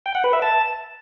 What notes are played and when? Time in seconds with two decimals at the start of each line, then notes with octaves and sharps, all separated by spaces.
0.06 G5
0.15 F#5
0.24 B4
0.33 E5
0.42 A5